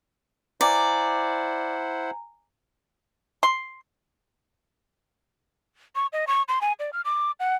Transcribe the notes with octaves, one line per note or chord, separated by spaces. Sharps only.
E4 C5 D5 F#5 G#5 A#5
C6
C#6
D#5
C#6
C6
G#5
D5
F6
D6
F#5